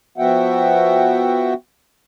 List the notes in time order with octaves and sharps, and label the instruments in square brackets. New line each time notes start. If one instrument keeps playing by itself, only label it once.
[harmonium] F3 B3 F#4 E5 F#5 G5